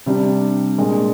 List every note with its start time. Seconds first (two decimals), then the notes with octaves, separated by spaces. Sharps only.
0.06 C3 G3 D4 G4
0.78 A#2 G#3 D4